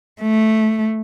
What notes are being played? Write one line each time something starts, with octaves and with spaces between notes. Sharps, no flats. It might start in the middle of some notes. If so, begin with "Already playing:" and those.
A3